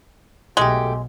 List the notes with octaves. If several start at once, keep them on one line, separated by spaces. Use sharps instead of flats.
B1 B2 G#3 A3 G4